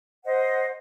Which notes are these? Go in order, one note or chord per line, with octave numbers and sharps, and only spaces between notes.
C5 D#5 F#5